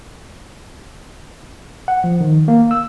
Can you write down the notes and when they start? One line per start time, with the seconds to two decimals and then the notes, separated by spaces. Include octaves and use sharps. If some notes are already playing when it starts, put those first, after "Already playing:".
1.88 F#5
2.04 F3
2.21 D#3
2.48 A#3
2.71 E6